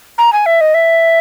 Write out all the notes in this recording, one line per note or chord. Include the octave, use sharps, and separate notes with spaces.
A#5
G#5
E5
D#5
E5